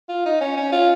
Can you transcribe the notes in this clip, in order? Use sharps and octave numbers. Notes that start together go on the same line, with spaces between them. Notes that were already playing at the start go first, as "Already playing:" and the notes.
F4
D#4
C#4
C#4
F4